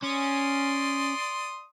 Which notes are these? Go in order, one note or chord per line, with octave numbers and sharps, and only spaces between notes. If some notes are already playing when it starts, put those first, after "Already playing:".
C#4 D5 C6 D#6